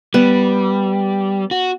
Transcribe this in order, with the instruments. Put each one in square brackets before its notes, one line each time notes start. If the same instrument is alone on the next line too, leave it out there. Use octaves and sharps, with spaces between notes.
[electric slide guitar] G3 [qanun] B3
[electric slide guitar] F#4